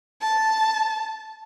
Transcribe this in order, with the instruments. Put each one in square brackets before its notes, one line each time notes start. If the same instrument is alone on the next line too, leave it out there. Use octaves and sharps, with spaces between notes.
[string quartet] A5